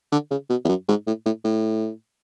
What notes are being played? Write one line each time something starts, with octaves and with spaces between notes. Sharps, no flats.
D3
C#3
B2
E2
F#2
G#2
A2
A2
A2